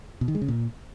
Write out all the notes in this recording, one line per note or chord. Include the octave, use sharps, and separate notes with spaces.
B2
D#3
G#3
C#3
A#2